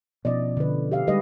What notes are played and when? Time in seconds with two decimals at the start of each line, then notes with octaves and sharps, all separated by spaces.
0.25 B2 F3 C#4 D5 D#5
0.57 D3 B4
0.92 G4 E5 F5
1.07 D3 G3 G#3 G4 B4 D#5